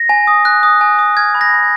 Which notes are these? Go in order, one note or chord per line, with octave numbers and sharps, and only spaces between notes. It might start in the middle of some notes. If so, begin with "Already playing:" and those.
Already playing: A#6
G#5
D#6
F#6
D#6
G#5
D#6
F6 G#6
B5
A#6
B5